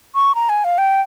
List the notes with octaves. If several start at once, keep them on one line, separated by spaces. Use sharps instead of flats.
C#6
A#5
G#5
F5
G5